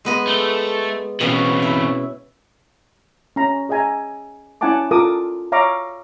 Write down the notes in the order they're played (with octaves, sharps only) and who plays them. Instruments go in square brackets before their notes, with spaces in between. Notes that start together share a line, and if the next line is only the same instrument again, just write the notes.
[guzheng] G#3 B3 D#5
[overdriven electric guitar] A3
[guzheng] B2 C#4 [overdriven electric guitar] E3 C4
[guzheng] E4
[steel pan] C#4 A#5
G#4 D#5 E5 G#5 A#5
C#4 E4 F#5 G#5 A5 D6
F4 A4 A#4 F#5 D6 D#6
C#5 E5 F5 A#5 C#6 D6